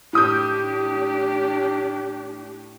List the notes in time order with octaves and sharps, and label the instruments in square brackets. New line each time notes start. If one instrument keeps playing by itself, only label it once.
[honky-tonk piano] A2 D#6 G6 [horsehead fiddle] D4 G4